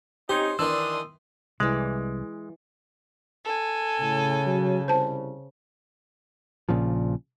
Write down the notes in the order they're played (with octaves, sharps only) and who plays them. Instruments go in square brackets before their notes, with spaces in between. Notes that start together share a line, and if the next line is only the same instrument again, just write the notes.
[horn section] C4 C#4 D#4 [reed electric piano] G4 [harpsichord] C5
[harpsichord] D#3 E3 [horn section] D4 [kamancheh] C6 D#6 [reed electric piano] E6
[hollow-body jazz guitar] C2 [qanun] E3 D5 [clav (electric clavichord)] G#3
[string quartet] A4 G#5
[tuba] A2 [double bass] C#3
[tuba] F#3
[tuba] C2 [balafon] C5 A5
[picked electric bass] A#1 A#2 C#3 F3